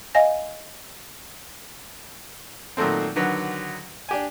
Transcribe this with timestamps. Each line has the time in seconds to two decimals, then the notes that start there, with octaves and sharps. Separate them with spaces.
0.15 D#5 F5 G#5 A#6
2.77 A#2 D#3 F#3 A3 C4
3.16 D3 D#3 F#3 B4
4.09 D4 G4 G#5